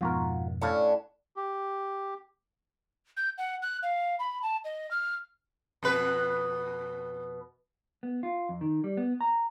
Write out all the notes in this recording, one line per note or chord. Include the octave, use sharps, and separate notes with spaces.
F2 G#2 B2 F4 F#4 A#4
A2 C#4 D4 A4 F5
G4
G6
F#5
F#6
F5
B5
A5
D#5
F6
F2 B2 B4
B3
F4
F2
D#3
G3
B3
A#5